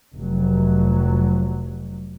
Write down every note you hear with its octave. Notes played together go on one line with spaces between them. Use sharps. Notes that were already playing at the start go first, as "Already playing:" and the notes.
F1 F#3